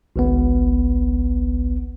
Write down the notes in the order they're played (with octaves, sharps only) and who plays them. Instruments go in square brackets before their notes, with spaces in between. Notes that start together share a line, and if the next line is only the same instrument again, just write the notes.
[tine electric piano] G#1 C#2 B3